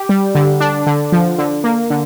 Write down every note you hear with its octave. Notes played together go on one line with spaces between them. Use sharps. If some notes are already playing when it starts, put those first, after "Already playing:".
Already playing: G4
G3
D3
D4
D3
F3
D3
A#3
D3